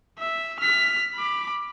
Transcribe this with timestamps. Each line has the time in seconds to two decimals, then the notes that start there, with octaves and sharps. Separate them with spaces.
0.19 E5
0.60 F6 B6
1.15 B5 D6